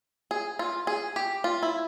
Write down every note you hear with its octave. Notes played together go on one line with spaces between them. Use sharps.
G#4
F4
G#4
G4
F4
E4